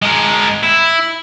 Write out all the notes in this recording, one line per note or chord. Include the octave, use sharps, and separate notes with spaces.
G#3 A#4
E4